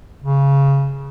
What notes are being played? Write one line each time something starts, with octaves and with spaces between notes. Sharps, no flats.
C#3